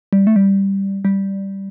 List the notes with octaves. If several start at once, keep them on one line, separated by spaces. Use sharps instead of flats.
G3
A3
G3
G3